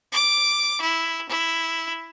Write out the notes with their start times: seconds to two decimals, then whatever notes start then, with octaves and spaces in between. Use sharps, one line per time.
0.12 D6
0.81 E4
1.29 E4